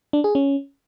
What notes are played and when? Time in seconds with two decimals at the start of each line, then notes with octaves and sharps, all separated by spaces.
0.13 D4
0.24 G#4
0.35 C#4